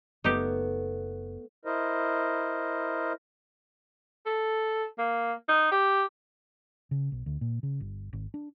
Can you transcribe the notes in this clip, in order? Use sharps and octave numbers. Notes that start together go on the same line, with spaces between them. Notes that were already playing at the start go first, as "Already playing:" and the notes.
F#1 A3 B3 D#4 G4
E4 A#4 C5 D#5
A4
A#3
D#4
G4
C#3
B1
D2
A#2
C#3
G1
G#1
D4